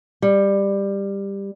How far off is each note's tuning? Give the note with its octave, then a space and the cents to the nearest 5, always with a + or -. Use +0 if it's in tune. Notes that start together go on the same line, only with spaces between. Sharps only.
G3 +15